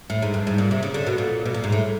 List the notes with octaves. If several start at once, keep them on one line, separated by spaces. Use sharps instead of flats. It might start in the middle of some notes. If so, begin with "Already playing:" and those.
A2
G#2
G2
G#2
A#2
C3
C#3
D3
B2
A#2
B2
A#2
G#2
A2